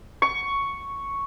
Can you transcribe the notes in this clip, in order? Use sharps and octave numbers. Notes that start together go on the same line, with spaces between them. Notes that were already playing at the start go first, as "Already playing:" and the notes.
C#6